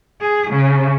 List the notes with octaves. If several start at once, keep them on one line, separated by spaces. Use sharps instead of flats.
G#4
C#3